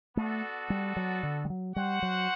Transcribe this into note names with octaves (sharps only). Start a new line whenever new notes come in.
A3 B3 F#4 A4 D5
G3
F#3
D3
G3
F#3
G3 F#4 C5 F#5
F#3